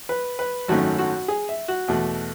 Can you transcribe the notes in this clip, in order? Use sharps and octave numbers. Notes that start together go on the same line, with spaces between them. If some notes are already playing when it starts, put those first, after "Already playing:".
B4
B4
G#1 F#2 D#3 A3 C#4 F#4
F#4
G#4
E5
F#4
E2 B2 A3